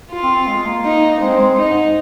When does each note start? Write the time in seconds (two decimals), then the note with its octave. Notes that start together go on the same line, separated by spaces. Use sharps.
0.11 F4
0.23 C4
0.35 C4
0.48 G#3
0.65 A#3
0.84 D#4
1.21 G#3 C4
1.39 G#3
1.57 D#4
1.70 G#2